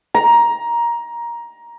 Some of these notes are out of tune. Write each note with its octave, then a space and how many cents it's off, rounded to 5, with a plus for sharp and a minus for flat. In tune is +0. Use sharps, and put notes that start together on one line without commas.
A#5 +15